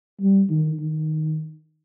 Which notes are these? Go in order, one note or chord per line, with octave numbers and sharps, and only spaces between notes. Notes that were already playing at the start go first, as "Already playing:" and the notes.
G3
D#3
D#3